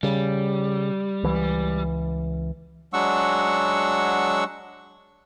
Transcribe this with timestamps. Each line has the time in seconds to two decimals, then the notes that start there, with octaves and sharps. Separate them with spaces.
0.03 C#3 G3
1.23 C#2 E3
2.93 F#3 G#3 D4 F#5 C#6 E6